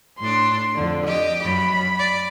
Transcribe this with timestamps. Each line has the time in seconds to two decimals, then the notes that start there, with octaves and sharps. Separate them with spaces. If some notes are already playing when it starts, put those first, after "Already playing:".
0.20 A2 D4 C6
0.76 F2 D3
1.07 G4 D#5
1.44 F#2 B5
1.99 D5